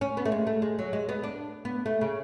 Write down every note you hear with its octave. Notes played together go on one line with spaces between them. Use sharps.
C#4
B3
A3
G#3
A3
G#3
F#3
G#3
B3
D4
B3
A3
C#3